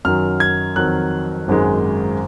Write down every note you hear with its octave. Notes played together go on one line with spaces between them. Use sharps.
F#2 D#3 F#3 F6
G#6
F2 D#3 F#3 F#6
G#1 F#2 D#3 G#3